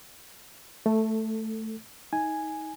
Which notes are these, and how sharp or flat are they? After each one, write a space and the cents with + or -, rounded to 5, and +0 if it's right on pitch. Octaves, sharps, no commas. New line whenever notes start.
A3 +0 A4 +20
D#4 +25 G#5 +0